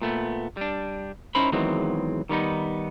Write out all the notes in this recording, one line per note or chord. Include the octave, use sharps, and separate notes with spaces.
A#2 A3 B3
G3 D4
C#4 D#4 E4 A#4 C5 B5
E2 D#3 E3 F#3 G#3 C4
D#3 G3 B3 D#4